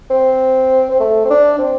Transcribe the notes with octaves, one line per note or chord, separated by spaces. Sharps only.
C4
C4
A3
C4
D4
C4